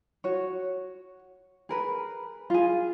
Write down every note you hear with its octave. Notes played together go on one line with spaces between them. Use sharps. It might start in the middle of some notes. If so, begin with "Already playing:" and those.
F#4 C#5
G#4 A#4 B4
F4 G#4